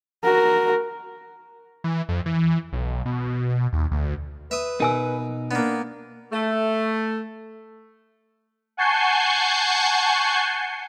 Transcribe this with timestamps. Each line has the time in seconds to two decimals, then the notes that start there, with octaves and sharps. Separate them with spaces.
0.24 F#4 A#4
1.84 E3
2.09 F2
2.26 E3
2.73 B1
3.06 B2
3.73 D#2
3.92 D2
4.51 B4 E5 D#6
4.80 B2 D#4 A#4 G#5 E6
5.51 A#3 B3 D4
6.32 A3
8.77 F#5 G#5 A5 C#6 G6 C7